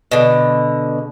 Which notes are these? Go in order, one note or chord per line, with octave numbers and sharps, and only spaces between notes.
B2 D3